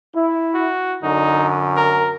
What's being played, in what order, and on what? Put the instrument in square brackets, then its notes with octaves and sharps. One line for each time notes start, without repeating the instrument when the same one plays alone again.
[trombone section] E4
[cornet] F#4
[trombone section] F#2 D3 [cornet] D#4
[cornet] A#4